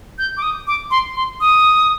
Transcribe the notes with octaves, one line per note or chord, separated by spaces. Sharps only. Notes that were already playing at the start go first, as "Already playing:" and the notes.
G6
D6
D#6
D6
C6
C6
D#6